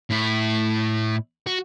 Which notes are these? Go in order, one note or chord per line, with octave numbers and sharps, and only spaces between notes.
A2 E4
F#4